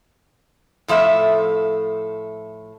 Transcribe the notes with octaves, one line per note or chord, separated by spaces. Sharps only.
A2 F3 A3 E5